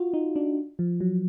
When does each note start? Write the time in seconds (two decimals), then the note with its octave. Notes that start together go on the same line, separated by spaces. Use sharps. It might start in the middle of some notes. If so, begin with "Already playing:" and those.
Already playing: F4 F#4
0.14 D#4
0.36 D4
0.79 F3
1.01 F#3